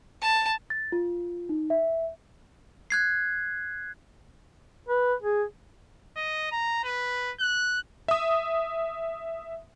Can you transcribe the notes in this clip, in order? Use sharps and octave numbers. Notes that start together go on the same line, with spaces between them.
A5
A6
F4
D#4
E5
F#6 G#6 C7
B4
G#4
D#5
A#5
B4
F#6
E5 D#6